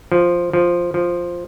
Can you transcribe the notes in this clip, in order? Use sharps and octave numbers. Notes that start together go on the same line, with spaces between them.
F3
F3
F3